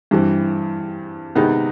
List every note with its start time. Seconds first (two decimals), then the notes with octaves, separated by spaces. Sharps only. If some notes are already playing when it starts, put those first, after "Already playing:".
0.11 G2 E3 G3 C4
1.35 C3 D#3 G#3 B3 D#4